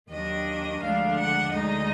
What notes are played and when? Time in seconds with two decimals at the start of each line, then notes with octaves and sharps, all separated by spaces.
0.10 D#2 D#3 F#3 D4 D#5
0.82 D2 D3 F3 G#3 D4 F5
1.18 F#5
1.52 D2 D3 G#3 D#4 D#5